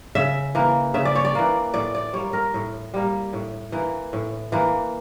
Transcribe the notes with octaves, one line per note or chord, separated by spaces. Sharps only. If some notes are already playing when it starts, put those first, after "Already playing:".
C#3 E5
E3 A#3
C#3 E5
D5
C#5
D5
E3 A#3
A2 D5
D5
G3 A#3 C#5
A#4
A2
G3 A#3
A2
E3 A#3
A2
E3 A#3